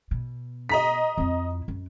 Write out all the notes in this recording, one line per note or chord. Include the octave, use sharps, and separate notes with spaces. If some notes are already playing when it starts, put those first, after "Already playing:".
B2
D#5 A#5 B6
F2 E4
F#2